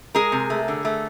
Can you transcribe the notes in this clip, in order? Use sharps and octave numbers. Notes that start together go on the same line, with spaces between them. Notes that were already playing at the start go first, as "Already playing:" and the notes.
G#3 G#4 A#4
C3
A3
D3
A3